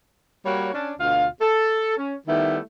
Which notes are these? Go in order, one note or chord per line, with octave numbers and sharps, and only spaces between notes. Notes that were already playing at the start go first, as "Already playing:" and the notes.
G3 A#3 F#4 C#5
C#4 D4
D2 B2 F4 F5
A4
C#4
D#3 G3 A3 B3 E4